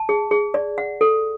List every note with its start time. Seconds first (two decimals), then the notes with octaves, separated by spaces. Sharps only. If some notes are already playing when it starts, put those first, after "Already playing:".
Already playing: A5
0.09 G#4
0.31 G#4
0.54 D5
0.78 F#5
1.01 A4